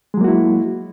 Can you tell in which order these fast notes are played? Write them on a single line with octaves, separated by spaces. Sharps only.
G#3 F#3 A#3 F#4 E4